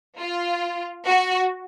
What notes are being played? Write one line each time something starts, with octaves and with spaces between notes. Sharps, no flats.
F4
F#4